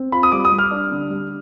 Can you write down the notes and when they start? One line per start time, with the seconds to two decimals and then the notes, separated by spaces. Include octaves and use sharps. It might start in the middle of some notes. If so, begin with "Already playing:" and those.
Already playing: C4
0.12 F4 B5
0.23 D#6
0.32 G3 D6
0.45 D#6
0.52 G3
0.58 F6
0.71 D4
0.91 D3
1.10 G3